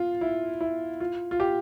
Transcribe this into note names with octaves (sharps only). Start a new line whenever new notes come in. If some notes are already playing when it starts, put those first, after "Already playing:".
Already playing: F4
E4
E4
F4
F4
G4